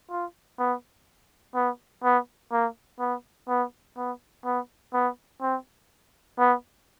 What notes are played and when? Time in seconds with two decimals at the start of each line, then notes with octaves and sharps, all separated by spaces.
0.11 F4
0.59 B3
1.55 B3
2.04 B3
2.52 A#3
3.00 B3
3.49 B3
3.97 B3
4.45 B3
4.94 B3
5.42 C4
6.39 B3